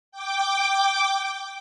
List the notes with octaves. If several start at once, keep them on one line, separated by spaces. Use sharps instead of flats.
G5 D6